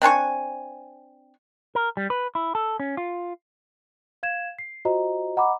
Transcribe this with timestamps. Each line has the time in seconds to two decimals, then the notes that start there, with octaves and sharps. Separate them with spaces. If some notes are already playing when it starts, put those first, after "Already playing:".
0.02 C4 D4 G#5 C#6
1.75 A#4
1.97 G3
2.10 B4
2.35 E4
2.55 A4
2.80 C#4
2.97 F4
4.23 F5 G#6 E7
4.59 C7
4.85 F4 F#4 C5 D#5 A#5
5.37 D#5 F#5 A#5 B5 D6